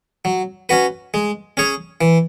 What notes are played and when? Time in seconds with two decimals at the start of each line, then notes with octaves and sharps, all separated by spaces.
0.25 F#3
0.69 C#4 F#4 B4
1.14 G#3
1.57 C#4 G#4 C#5
2.01 E3